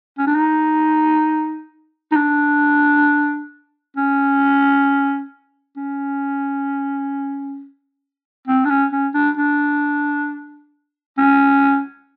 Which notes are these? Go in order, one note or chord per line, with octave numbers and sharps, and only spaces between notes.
C#4
D4
D#4
D#4
D4
C#4
C#4
C4
D4
C#4
C#4
D4
D4
C#4